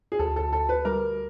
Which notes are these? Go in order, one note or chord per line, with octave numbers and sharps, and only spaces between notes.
G#4
D2 A4
A4
D2 A4
B4
G3 A#4